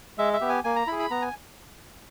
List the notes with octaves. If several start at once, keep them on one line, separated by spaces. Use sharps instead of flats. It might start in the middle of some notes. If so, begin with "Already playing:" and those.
G#3 E5
E5
B3 G4
G#5
A#3 G#5
A#5
E4 G#4 B5
B5
B3 A#5
G#5